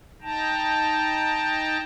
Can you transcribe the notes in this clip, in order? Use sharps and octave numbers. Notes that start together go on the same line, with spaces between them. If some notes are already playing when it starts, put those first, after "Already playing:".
D#4 G5 A5 A#5